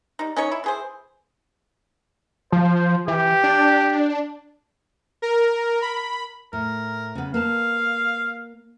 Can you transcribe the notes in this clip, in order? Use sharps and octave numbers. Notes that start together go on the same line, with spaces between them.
G3 D#4
C#4 D#4 C#5
E4
E3 G#4 C5
F3 C5
E3 G4
D4
A#4
B5
A2 A#4
C#3 B3
A#3 B4 F5 A5